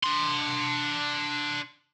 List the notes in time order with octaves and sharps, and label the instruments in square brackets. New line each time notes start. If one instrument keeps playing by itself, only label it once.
[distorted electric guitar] D4 C6